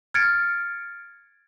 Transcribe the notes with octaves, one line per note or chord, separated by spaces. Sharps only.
F6 G#6 A6 C#7 D7